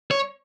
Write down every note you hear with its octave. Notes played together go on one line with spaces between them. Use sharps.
C#5